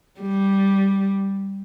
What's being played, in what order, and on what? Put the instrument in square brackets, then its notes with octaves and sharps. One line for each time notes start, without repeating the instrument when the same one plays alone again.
[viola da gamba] G3